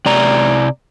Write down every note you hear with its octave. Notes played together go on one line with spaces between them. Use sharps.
C3 D5 A#5